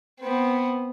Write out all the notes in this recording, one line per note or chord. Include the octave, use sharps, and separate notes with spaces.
B3 C4